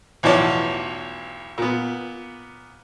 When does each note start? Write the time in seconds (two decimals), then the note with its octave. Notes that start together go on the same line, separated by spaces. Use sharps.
0.23 B1 E2 A2 F3 C#5 D5
1.58 A#2 B3